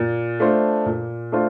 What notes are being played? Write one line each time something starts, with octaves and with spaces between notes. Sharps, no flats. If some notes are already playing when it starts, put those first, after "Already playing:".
Already playing: A#2
A3 D4 F4 C5
A#2
A3 D4 F4 C5